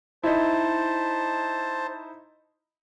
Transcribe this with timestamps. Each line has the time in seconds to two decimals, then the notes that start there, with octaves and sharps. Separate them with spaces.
0.24 D#4 E4 C5 A5